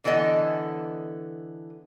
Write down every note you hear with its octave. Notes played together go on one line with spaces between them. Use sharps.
D3 E3 B3 A4 D#5